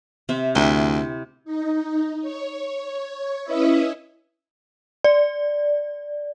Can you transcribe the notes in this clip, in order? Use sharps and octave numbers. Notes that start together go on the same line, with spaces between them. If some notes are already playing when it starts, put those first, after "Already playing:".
C3 C4 E5
D2 E4
D#4
C#5
C#4 E4 B4 D#5 E5
D5